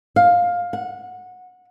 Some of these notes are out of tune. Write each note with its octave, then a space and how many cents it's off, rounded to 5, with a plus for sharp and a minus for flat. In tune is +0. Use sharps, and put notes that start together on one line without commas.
F5 +15
F#5 -20